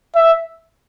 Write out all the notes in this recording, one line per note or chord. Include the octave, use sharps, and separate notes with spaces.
E5